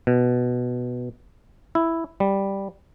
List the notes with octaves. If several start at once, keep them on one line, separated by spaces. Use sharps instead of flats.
B2
E4
G3